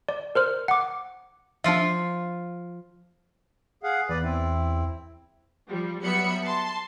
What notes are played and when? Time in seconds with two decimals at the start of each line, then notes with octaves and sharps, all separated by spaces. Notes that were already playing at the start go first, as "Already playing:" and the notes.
0.09 D5
0.35 A#4 C5 F6
0.68 F#5 D6
1.64 F3 D4 F4 E5
3.83 G#4 F5 F#5
4.09 E2 B4 D5
4.22 C4 E4
5.69 F3 G3
6.02 F#3 G3 B3 E5 B5 C#7
6.44 A5 C6